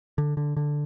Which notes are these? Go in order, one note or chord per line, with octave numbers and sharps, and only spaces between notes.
D3
D3
D3